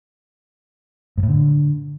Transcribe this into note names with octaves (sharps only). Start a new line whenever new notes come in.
G#2
A2
D3